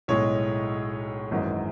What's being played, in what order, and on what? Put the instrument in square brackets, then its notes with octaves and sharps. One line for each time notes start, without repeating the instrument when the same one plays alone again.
[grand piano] B1 A2 G#3 C#5
G#1 F#2 E3 G#3